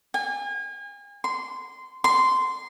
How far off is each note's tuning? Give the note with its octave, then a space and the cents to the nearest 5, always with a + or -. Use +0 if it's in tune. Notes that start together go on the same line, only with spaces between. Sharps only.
G#5 -35
C6 -20
C6 -15